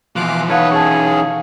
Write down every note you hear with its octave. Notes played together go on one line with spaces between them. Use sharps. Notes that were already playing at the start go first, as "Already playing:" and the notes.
B2 E3 F3 F5 D6 F#6
E3 D#4 A4 B4 C#5 F5 F#5
C#4 G#4 A5 C#6